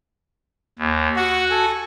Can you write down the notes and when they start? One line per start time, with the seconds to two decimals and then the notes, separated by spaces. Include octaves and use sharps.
0.79 D#2
1.16 F#4 F#5
1.50 A4 G#5